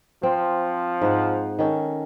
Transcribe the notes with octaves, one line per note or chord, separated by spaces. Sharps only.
F3 C4
G#2 F#5
D#3 C#4 A4